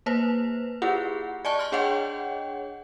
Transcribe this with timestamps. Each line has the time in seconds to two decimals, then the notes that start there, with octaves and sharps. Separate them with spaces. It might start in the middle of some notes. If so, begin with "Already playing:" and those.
0.06 A#3 B4 C5
0.82 E4 F4 G4 G#4 F#5
1.45 D5 D#5 G#5 A5 C#6
1.59 C6 F6
1.72 D4 G#4 C#5 D#5 F#5 G5